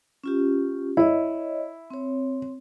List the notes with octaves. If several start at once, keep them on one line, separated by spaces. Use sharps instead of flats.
C#4 F4 G4
E4 C#5 D#5
C4 C#5